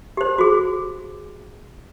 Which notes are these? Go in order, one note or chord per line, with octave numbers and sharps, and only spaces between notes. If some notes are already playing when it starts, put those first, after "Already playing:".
G4 C5
F#4 G#4